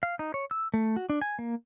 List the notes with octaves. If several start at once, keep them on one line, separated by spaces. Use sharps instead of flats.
F5
D#4
C#5
E6
A3
F#4
D4
G#5
A#3